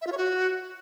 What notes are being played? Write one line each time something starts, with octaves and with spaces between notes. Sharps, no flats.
E5
F4
C#5
F#4